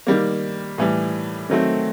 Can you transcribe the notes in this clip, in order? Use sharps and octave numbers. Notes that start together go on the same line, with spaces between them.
D#3 G3 A#3
A2 E3 G3
D#3 F#3 A3 C4